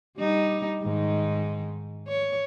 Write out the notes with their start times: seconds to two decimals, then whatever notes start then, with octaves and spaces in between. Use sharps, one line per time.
0.18 G3 D#4
0.83 G#2 D#3 D#4
2.08 C#5